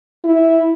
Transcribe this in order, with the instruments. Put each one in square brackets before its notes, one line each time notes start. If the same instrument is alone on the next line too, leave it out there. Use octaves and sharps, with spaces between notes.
[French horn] E4